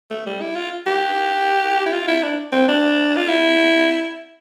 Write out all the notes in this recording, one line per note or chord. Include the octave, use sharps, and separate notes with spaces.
A3
G3
E4
F4
G4
E4
F4
E4
D4
C4
D4
F4
E4